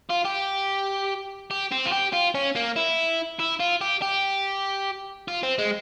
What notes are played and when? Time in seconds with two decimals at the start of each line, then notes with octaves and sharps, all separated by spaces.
0.09 F4
0.25 G4
1.51 G4
1.72 C4
1.86 F4
1.93 G4
2.13 F4
2.35 C#4
2.56 A#3
2.76 E4
3.40 E4
3.60 F4
3.81 G4
4.02 G4
5.28 F4
5.43 C4
5.58 G#3